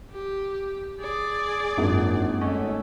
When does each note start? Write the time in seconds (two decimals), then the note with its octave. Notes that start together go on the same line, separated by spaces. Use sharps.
0.10 G4
1.00 G#4 D5
1.78 G#1 F#2 A#3 D4 F4
2.41 A3 C#4 D#5